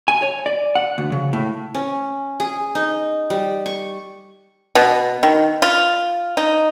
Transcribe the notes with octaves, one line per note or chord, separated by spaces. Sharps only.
G#5
C#5
D5
F#5
D2
C#3
A2
C#4
G#4
D#4
G3
C#6
B2
D#3
F4
D#4